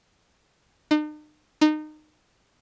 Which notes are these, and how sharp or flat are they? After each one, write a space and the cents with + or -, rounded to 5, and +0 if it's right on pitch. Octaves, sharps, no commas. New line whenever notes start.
D#4 -45
D#4 -25